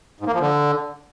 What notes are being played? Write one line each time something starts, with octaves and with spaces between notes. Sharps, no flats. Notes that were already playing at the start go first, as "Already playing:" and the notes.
G#2
A#3
F3
D3